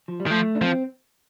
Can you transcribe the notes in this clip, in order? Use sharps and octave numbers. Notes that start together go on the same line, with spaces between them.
F3
G3
D#3
F3 A3
D4
F3 C4